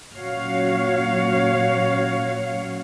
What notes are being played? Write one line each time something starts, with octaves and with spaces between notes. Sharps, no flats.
A#2 F#3 C#4 F#4 C#5 F5